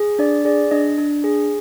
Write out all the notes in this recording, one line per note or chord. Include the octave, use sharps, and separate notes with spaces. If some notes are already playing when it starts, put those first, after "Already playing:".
Already playing: G#4
D4 D5
G#4 D5
D4 D#5
D4
G#4